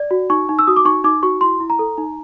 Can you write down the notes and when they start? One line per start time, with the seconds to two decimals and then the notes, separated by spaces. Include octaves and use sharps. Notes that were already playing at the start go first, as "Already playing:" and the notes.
Already playing: D5
0.11 F#4
0.30 D#4 C#6
0.49 D#4
0.59 E6
0.67 F#4 D#6
0.76 D6
0.85 D#4 C#6
1.04 D#4 D6
1.23 F#4 C#6
1.41 E4 C6
1.60 E4
1.70 A#5
1.79 A4
1.98 D#4